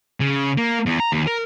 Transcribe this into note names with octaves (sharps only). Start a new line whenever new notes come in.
C#3
A#3
E2
A#5
D#2
A#4